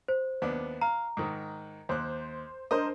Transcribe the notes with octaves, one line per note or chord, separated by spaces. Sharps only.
C5
D#2 B3 D4
F5 A#5
G#2 D#3
D#2 C5 F#6
D4 A#4 C5 D#5